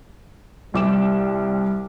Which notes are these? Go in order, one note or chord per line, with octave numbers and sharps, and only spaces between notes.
C2 G3 D6 E7